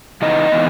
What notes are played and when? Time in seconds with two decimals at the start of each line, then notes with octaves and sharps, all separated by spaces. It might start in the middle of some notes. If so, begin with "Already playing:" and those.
0.22 C#3 E3 B3 D#4 D#5
0.52 E3 B3